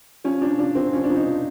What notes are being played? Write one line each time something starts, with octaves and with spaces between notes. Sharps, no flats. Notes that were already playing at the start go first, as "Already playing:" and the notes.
F3 C#4
F3 D4
F3 D4
F3 C4
F3 C#4
D4
F3
D#4
F3